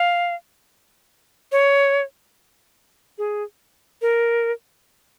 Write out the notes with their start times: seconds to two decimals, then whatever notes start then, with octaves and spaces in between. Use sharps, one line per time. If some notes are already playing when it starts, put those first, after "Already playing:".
Already playing: F5
1.52 C#5
3.18 G#4
4.02 A#4